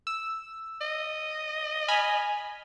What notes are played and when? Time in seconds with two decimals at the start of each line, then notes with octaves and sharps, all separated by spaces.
0.07 E6
0.81 D#5
1.88 G#5 B5 F6